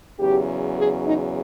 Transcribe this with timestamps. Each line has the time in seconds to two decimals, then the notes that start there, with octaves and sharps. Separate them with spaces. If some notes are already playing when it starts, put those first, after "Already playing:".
0.20 E2 C#3 F#3 G4
0.77 G#4
1.05 D#4